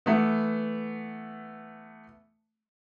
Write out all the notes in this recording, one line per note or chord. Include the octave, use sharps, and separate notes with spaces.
E3 A3 B3